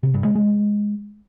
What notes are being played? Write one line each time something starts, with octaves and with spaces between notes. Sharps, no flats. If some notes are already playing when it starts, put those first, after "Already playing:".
C3
G2
G#3
G#3